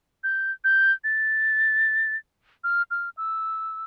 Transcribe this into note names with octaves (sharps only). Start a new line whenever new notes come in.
G6
G6
A6
F6
F6
E6